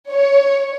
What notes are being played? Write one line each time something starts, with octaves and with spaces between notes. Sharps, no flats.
C#5